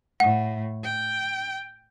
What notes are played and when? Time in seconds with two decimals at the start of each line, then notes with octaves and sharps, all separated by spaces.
0.20 A2 F#5
0.84 G5